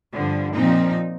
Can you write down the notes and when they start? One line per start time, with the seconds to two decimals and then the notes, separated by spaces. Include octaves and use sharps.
0.13 G2 D3 F3
0.54 A#2 F3 C4 D#4